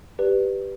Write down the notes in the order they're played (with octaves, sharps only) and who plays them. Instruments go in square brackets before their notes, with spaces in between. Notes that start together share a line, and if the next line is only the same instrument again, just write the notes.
[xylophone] G4 B4 D5